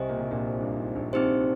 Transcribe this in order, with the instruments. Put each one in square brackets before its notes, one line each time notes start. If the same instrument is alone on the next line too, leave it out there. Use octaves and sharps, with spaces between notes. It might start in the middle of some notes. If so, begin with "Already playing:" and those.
Already playing: [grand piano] C2 C3 [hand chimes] G4 C5 D#5 G#5
[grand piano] A#2
C3
A#1 A#2
G2
G#1 G#2
A#1 A#2
[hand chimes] C4 D#4 G4 C5